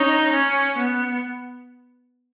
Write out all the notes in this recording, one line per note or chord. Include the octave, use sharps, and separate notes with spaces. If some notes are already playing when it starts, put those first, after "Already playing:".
Already playing: C#4 D#4
C#4
B3